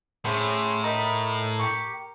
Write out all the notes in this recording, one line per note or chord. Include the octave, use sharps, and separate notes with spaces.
A2 C#4 G#4 C5 B5
D#4 A#4 D#5 A#5 B5
G4 C#6